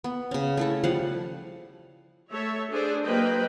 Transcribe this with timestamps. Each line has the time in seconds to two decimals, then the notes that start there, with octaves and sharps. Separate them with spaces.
0.04 B3
0.31 C#3 C#4
0.57 A3 E4 A4
0.84 F3 G3 F5 F#5
2.31 A3 A4 C#5 E5
2.70 D4 G#4 A4 C5
3.05 F#3 A#3 B4 C5 D#5 G5